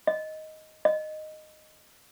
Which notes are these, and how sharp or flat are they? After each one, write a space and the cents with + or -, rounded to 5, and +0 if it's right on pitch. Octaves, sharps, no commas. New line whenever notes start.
D#5 +5
D#5 -10